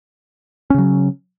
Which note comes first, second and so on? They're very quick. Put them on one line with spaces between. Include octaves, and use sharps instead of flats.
C#4 C#3 F#3